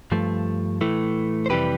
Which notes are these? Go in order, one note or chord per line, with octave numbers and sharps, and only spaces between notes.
G2 F3 A3
A2 E3 A3
C5
F2 C3 E3 G3 G4 B4